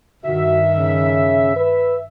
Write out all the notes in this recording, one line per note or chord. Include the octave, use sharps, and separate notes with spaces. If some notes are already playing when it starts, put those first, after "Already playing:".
G2 D#3 F#4 E5
C#3
B4